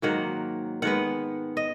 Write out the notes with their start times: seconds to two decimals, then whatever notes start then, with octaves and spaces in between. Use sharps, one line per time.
0.02 G#2 D#3 F#3 A#3 F#5
0.82 D#3 G#3 B3 F#5
1.57 D#5